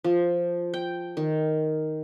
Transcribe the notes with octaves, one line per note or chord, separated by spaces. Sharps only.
F3
G5
D#3